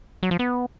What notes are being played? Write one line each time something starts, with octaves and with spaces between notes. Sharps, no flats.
F#3
F3
B3